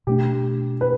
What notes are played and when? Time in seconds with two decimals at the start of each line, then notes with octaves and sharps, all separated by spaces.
0.07 B2 A3 D4 G4
0.81 B4